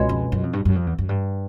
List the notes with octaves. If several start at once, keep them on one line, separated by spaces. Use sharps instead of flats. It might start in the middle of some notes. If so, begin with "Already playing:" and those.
Already playing: C#2 B2 G#3
F2
F#2
F2
G2
F#2
F2
E2
F#2
G2